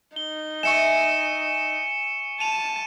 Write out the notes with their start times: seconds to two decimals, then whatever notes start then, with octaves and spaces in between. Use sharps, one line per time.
0.16 D#4 G7
0.63 E5 G#5 C#6 C#7 E7
2.40 A5 D#7 F7